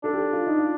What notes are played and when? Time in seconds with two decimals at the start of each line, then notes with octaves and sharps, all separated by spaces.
0.04 D4 A4
0.13 G4
0.19 A4
0.33 F4
0.47 D#4
0.58 F4